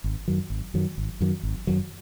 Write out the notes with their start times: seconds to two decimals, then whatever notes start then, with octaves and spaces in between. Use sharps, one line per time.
0.04 G#1
0.28 F#2 D#3 F#3
0.50 G#1
0.74 F#2 D#3 F#3
0.98 G#1
1.21 F#2 D#3 F#3
1.43 G#1
1.67 F#2 D#3 F#3